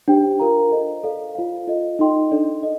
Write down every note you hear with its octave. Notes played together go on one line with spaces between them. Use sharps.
D4 G4 C5 G5
D4 F4 A#4 F5 A#5
A4 C5 D#5
A4 D5 F5
F4 C5 F5
F4 A4 D#5
D#4 A4 D#5 G5 C6
D4 A4 D5
A4 D#5